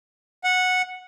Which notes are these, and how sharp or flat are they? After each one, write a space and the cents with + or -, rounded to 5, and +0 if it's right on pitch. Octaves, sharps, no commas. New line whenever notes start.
F#5 -10